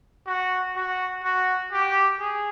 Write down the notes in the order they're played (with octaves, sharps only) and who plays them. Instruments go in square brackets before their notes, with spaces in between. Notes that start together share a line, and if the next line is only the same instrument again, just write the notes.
[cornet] F#4
F#4
F#4
G4
G#4